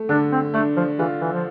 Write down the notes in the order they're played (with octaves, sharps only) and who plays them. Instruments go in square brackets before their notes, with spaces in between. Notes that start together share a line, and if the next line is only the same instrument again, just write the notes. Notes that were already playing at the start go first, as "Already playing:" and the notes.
Already playing: [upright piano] A3
[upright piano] D3 [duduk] D4
[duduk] C4
[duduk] A3 [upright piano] D4
[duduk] F3
[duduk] E3 [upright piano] F4
[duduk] E3
F3